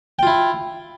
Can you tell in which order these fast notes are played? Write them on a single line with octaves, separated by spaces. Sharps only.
G5 F4 E4